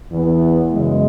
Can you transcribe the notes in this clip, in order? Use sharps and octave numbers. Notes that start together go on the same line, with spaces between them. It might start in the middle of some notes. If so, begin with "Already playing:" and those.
E2 E3 B3
F#2 C#3 G#3